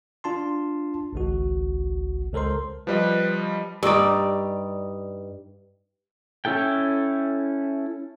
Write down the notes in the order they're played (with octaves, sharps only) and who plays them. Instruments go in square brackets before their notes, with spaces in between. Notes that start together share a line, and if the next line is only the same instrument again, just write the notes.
[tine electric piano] D4 F4 A5 C6
G#1 C#2 F#4
C#2 A4 A#4 C5 C6
[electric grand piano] F3 G3 D#5 [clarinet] B4
[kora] G2 G3 D#4 D5
[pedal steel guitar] C#4 E4 A4 G5